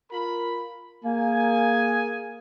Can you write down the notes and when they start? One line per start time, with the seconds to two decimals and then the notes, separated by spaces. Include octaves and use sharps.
0.12 F4 A#4 B5
1.04 A#3 G#4 A#4 G#5